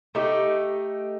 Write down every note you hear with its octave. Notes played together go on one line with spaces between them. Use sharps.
A3 D#4 G4